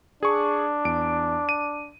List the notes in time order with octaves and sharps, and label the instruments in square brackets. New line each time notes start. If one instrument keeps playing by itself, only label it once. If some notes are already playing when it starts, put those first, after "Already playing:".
[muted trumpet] D4 [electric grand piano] G#4 C#6
[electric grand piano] E2 D7
D#7